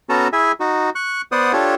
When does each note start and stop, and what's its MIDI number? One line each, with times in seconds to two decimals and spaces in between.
0.09 0.28 59
0.09 0.28 61
0.09 0.28 66
0.09 0.28 69
0.09 0.28 81
0.09 0.28 82
0.33 0.52 64
0.33 0.52 68
0.33 0.52 76
0.33 0.52 80
0.60 0.90 63
0.60 0.90 66
0.95 1.22 85
0.95 1.22 90
1.32 1.52 59
1.32 1.52 72
1.32 1.52 74
1.32 1.52 78
1.32 1.52 87
1.53 1.75 62
1.53 1.75 65
1.53 1.75 67
1.53 1.75 69
1.53 1.75 73